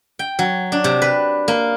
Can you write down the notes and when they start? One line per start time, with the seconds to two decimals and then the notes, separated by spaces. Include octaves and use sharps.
0.19 G5
0.39 F#3
0.72 D4
0.84 C3
1.02 B4
1.48 A#3